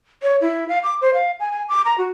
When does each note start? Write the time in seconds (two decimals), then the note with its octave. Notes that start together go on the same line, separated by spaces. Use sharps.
0.23 C#5
0.41 E4
0.69 F5
0.83 D6
1.01 C5
1.14 F5
1.40 G#5
1.52 G#5
1.69 D6
1.85 A#5
1.98 F#4